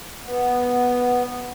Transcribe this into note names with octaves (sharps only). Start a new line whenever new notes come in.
B3